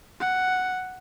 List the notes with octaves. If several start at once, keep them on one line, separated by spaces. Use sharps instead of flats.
F#5